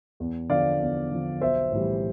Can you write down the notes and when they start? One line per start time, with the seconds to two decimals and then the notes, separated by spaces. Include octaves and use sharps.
0.20 E2
0.49 D3 F3 D5 F5
0.80 E2
1.12 D3 F3
1.41 B1 C5 E5
1.72 A2 E3 G3